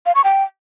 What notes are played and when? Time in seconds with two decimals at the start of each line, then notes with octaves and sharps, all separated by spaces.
0.06 F5
0.15 C#6
0.24 G5